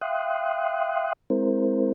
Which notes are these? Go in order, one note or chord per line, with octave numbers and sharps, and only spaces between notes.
E5 F5 G5 C6 D#6 F#6
G#3 C4 E4 A#4 C5